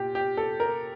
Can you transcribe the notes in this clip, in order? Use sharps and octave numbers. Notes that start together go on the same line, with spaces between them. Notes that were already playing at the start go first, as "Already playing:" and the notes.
Already playing: A#2 G4
G4
A4
A#4